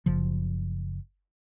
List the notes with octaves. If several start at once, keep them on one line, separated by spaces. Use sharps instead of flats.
F#1 C#3 F3